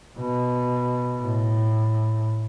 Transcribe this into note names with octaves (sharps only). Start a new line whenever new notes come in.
B2
A2